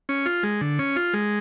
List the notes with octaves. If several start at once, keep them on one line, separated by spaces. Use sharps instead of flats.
C#4
F4
G#3
D3
C#4
F4
G#3